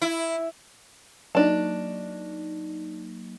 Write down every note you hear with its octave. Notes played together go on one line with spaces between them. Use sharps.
E4
F#3 A#3 D4 D#4 A5